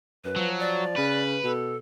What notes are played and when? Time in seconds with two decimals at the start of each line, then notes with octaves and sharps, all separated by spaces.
0.25 F#2 B4
0.36 F3 F#3
0.59 D5
0.97 C#3 B4
1.44 B2 A4